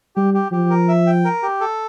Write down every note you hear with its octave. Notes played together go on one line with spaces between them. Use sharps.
G3 G4
G4
F3 G4
A#4
E5
G5
A#4
G4
A4